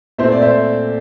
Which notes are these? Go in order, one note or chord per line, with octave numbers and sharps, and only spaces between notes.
A#2 A3 C4 C5 E5
D5
C5 E5